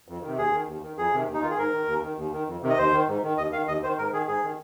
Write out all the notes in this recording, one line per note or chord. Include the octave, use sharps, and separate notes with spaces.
F2
C3 D#3
D#2 G#4
D#3
D#2
D#3
F2 G#4
C3 D#3
D#2
D#4
D#3 F4
G#4
G#2 A#4
D#3
D#2
D#3
D#2
D#3
F2
C3 D#3
D#5
D#2 C5
D#3
G#2
D#3
D#2 D#5
D#3 F5
D#2 D#5
D#3 C5
G#2 A#4
D#3 G#4
G#2 G#4
D#3